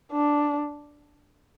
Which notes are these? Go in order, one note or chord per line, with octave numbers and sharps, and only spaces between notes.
D4